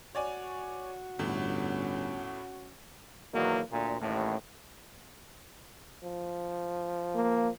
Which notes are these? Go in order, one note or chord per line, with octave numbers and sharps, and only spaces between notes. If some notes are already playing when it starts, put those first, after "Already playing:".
F#4 C#5 D5 G#5
G1 E2 A2 C#4
E2 B2 D#3 F#3 A#3
D2 A#2
A1 D#2 A2
F3
A#3